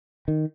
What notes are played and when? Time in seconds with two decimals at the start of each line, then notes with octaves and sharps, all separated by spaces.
0.28 D#3